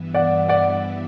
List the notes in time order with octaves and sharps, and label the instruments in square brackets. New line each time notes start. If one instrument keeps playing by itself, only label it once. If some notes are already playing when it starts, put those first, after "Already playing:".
Already playing: [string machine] G2 E3 B3 E4
[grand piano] D5 F#5
D5 F#5